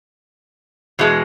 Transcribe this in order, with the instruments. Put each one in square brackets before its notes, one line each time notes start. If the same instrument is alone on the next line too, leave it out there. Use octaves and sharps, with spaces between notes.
[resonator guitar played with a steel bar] E2 B2 G#3